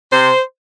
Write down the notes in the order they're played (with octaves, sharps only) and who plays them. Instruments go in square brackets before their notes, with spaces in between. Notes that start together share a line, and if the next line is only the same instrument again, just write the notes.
[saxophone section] C3 C5